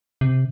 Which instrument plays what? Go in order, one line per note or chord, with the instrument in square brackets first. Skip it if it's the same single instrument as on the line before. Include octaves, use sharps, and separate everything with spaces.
[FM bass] C3